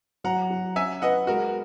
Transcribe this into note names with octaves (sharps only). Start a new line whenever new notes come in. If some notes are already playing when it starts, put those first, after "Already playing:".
F#3 F#5 A#5
F#4
C#4 E5 G#5
B4 D#5 F#5
G#3 F#4 A#4